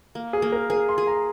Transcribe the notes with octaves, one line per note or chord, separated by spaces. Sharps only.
A#3
G#4
A#3
A#4
G#4 A#4
C6
G#4
A#5